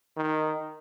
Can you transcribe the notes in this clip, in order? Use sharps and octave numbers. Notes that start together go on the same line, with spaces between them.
D#3